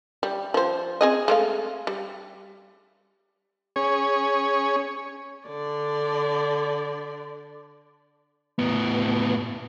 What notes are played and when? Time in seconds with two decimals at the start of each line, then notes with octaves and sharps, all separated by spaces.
0.23 G3
0.54 F3 C5
1.01 C4 G#4 D#5
1.28 G#3 A3 F5
1.87 G3
3.76 C#4 G#4 C#5
5.48 D3 D5
8.59 A2 B3